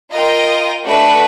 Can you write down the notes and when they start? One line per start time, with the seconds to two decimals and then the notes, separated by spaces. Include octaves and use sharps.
0.10 F4 A#4 D#5 G5
0.84 A3 D4 F#4 B4